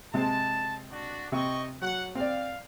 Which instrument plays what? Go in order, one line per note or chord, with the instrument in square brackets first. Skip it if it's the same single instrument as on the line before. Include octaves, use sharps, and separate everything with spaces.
[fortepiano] C3 G#3 C4 [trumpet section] A5
[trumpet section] D4 F#4
[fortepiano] C3 [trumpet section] D#5 G5 C#6
[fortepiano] F#3 [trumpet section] F#5
[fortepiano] C4 D5 [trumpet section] F5